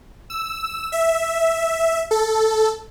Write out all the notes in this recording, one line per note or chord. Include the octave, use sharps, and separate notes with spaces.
E6
E5
A4